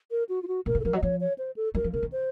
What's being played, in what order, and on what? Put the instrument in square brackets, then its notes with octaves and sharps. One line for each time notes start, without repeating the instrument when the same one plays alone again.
[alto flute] A#4
F#4
F4
F#4
[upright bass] A#2 [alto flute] A#4
[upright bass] C#3
[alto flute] A4
[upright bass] F3 [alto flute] A#4
[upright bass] F#3
[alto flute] D#5
[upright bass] F3 [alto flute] C#5
[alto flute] C#5
C5
A4
[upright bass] F#3 [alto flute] A#4
[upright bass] F3
[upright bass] C#3 [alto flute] A#4
[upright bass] D#3
[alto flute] C5